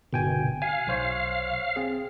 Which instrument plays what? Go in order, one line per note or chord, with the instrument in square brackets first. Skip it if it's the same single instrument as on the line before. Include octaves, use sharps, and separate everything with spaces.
[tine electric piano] G1 G5 G#5 [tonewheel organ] B2
[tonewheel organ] F5 [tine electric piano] G#5
[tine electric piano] B1 C5 C#5
C4 G#4